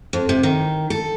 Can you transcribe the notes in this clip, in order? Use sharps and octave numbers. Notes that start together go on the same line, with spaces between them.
F2
C3
D#3
A4